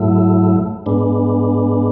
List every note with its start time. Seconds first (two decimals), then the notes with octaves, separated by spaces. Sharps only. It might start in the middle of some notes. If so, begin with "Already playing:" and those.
Already playing: G#2 F#3 A3 E4
0.86 G#2 G#3 B3 D4